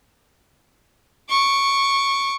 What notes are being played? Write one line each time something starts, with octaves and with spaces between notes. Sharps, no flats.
C#6 D6